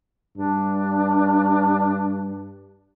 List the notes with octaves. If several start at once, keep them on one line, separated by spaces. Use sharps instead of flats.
G2 D4